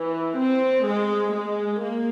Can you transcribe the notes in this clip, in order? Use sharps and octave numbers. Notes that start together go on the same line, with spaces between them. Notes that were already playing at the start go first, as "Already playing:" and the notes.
Already playing: E3
C4
G#3
G#3
A#3